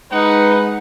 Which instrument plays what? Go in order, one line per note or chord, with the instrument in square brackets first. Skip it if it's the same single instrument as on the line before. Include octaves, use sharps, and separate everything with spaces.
[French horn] G#3 [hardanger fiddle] D#4 [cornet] B4 [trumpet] F#5